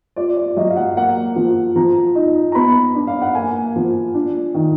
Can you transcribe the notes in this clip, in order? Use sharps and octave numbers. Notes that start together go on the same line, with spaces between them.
F4 D5
D5
F#3 D#5
F5
F#5
A#3 F#5
F3
F3 A#5
D#4
A#5
B3 B5
D4
F5
F#5
A#3 G#5
F3
D4
D#3